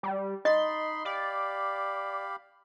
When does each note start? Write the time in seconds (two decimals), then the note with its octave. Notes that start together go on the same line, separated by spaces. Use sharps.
0.03 G3
0.45 D#4 D#5 B5 C6
1.05 G4 D5 F5 B5